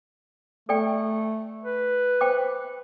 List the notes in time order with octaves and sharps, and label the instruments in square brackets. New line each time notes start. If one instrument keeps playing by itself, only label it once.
[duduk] A3 [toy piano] A4 D5 G5
[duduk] B4
[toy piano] C5 G5 D6